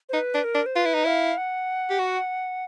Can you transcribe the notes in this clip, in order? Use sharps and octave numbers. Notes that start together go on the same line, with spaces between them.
C5
D#4 B4
D4
A#4
D4
C5
F4 B4
E4
D#4
E4 F5
F#5
G4
F#4